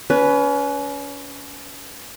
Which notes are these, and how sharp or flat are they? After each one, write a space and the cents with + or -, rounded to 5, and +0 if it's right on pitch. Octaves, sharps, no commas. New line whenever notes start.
C#4 +30 B4 +0